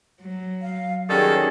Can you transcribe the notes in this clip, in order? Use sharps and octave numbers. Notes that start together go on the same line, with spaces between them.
F#3
F5
D#3 G3 C#4 F#4 G#4 A4